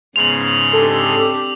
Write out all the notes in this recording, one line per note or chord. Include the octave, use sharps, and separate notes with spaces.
G#2 C#3 B3 C#4 C6 F7 F#7
C4 D4 G4 A4